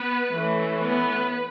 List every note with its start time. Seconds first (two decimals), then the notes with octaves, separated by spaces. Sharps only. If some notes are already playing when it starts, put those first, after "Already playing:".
Already playing: B3 B4
0.33 E3 A3 C#4
0.82 B3 B4